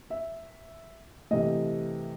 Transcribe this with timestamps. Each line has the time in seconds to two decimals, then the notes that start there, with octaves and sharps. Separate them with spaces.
0.10 E5
1.31 C3 E3 A3 D#5